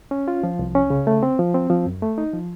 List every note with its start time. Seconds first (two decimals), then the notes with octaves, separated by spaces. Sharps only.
0.11 C#4
0.28 F4
0.43 F3
0.59 C2
0.75 C#4
0.90 C#3
1.07 A3
1.23 C4
1.39 F3
1.54 C4
1.70 F3
1.86 F#2
2.02 A3
2.18 D#4
2.33 F3